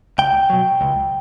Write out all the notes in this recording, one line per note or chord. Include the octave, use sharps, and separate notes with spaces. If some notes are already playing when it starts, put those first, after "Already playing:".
C#2 G5
B2 F#3
C#2